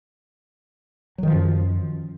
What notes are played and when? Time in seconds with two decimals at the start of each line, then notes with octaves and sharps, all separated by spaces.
1.18 F#3
1.23 D#3
1.28 F3
1.32 F#2